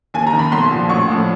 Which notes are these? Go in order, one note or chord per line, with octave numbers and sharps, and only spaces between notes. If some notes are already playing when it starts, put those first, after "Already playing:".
D#2 G#5
A#5
D#3
B5
B1 C6
A#2 F3
A1 C#6
A2 F3